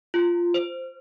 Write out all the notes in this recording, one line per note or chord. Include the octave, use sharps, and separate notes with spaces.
F4
C5